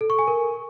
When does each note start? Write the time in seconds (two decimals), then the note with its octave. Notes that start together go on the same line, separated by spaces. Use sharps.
0.01 A4
0.10 C#6
0.19 G#5
0.28 A#4